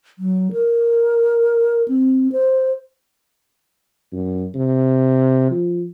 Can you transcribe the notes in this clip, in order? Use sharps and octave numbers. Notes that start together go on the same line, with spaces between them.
F#3
A#4
C4
C5
F#2
C3
F3